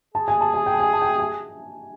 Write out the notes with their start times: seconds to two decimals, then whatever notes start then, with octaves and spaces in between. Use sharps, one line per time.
0.14 G#4 A5
0.28 G#5
0.41 A5
0.54 G#5
0.66 G5
0.74 A5
0.80 G#5
0.93 A5
1.01 G5
1.06 G#5
1.20 G#5